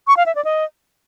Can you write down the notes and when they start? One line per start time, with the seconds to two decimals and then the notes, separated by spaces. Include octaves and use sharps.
0.07 C#6
0.17 F5
0.26 E5
0.35 D5
0.45 D#5